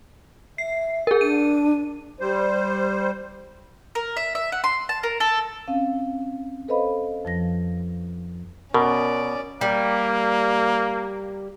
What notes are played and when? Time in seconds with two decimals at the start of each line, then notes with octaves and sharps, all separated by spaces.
0.58 E5 C7
1.07 G#4 A#4
1.21 D4 D#7
2.20 G3 C5
3.95 A#4
4.17 E5
4.35 E5
4.52 F#5
4.64 C6
4.89 A5
5.03 A#4
5.20 A4
5.68 C4 C#4 F5
6.68 A4 B4 C5 D#5 F5 B5
7.25 F2 F3 A#6
8.74 B2 C#4 A#4 D5
9.61 G3 A#3